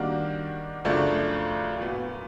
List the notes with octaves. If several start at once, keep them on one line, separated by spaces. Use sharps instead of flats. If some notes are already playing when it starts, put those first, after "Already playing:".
Already playing: D#3 G3 A#3 D4 F#4
F#2 C#3 F3 A3 D4
A#2 F#3 B3